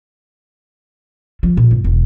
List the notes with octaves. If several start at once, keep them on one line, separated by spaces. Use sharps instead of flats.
F3
A#2
G#1
E1